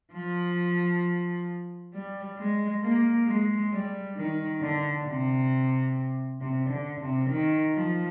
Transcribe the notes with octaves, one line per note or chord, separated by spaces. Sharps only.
F3
G3
G#3
A#3
G#3
G3
D#3
D3
C3
C3
D3
C3
D#3
F3